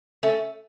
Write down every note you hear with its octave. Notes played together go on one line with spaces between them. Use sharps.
A3 C#4